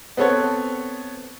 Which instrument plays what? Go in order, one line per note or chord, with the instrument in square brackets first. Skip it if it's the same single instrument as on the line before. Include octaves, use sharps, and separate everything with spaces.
[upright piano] B3 C4 A4 C#5 F#5